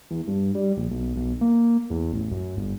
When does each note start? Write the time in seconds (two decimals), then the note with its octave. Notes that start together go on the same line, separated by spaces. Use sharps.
0.11 E2
0.28 G2
0.55 G3
0.77 A#1
0.91 B1
1.16 B1
1.41 A#3
1.90 E2
2.13 A1
2.31 F#2
2.57 G1